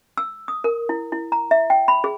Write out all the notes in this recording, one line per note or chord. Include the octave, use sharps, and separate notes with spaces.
E6
D#6
A#4
E4
E4
A#5
E5
G5
B5
G#4